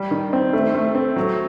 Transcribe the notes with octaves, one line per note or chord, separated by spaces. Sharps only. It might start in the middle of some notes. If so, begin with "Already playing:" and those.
Already playing: G3
D#3
C4
A3
A3
C4
F#3